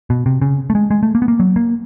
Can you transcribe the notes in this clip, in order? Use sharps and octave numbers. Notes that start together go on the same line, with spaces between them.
B2
C3
C#3
A3
G#3
G#3
A3
A#3
B3
A#3
F#3
A#3